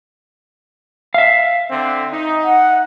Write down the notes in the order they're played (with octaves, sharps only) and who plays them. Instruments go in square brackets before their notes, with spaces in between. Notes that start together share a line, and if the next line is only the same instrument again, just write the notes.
[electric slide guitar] E5 F5
[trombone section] D3 C4
D#4
[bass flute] F#5